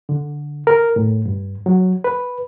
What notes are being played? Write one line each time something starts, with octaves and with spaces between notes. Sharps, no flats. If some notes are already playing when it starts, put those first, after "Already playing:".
D3
A#4
A2
G2
F#3
B4